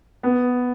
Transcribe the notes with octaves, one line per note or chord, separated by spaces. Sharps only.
B3